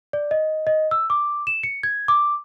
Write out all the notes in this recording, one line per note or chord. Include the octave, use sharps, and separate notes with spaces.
D5
D#5
D#5
E6
D6
E7
C#7
G#6
D6